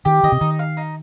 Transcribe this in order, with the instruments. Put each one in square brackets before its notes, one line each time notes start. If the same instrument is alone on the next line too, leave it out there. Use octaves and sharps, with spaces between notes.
[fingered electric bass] D#3 [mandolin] G4
[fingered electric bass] D#3 [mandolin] D#5
[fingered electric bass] C3
[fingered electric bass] D#3 [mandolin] D#4
[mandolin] F5
D#4